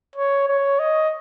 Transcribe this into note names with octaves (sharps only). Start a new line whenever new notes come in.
C#5
C#5
D#5